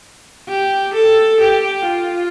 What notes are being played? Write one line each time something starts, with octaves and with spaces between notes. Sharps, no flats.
G4
A4
G4
F4